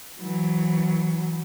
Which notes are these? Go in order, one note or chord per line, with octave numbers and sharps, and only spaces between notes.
E3 F#3